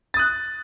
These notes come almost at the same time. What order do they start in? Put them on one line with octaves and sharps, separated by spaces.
A6 D#6 F#6